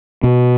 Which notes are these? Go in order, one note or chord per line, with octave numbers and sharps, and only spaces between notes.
B2